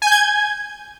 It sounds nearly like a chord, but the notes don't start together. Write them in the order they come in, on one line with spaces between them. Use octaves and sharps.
G#5 G6 G#6